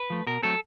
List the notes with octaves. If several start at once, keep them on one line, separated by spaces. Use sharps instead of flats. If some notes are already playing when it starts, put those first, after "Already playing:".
Already playing: B4
F3 A3
B2 A#4
F#3 A3 C4 A4